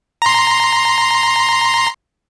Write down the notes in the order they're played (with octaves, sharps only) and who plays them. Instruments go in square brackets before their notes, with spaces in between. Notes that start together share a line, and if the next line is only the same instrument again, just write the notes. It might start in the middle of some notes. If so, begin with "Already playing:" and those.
[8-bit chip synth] A#5 C6